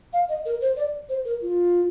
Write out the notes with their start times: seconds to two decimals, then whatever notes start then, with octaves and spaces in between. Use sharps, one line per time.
0.13 F5
0.29 D#5
0.46 A#4
0.61 C5
0.77 D5
1.09 C5
1.25 A#4
1.42 F4